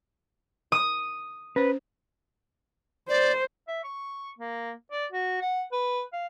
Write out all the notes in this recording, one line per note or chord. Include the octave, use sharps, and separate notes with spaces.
D#6
C#4 B4 C5
C5 D5
E5
C#6
A#3
D5
F#4
F#5
B4
F5